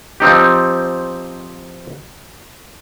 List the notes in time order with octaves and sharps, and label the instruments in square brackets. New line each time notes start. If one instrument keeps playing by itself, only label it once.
[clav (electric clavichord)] F3 C4 D#4 G4